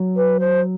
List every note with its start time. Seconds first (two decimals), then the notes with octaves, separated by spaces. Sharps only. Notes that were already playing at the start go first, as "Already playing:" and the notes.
Already playing: F#3
0.16 B4
0.40 C5